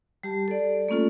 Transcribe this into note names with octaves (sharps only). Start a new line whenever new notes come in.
G3 G4 A5
A4 D5
A3 A#3 C#4 F4 A4